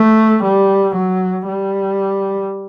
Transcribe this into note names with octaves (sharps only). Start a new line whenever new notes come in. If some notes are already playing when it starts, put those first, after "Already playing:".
Already playing: A3
G3
F#3
G3